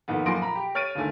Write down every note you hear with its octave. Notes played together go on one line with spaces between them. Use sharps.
F2 A#2 D#3 B3
F#2 A#2 F3 C6 A#6 D7
A#5 B5
G4
C#5 F6 A6 D7 D#7
G1 D#2 A3 G#5